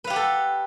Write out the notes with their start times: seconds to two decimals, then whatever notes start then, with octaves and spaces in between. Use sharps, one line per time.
0.04 B4
0.07 F5
0.10 G4
0.13 F#5
0.16 A4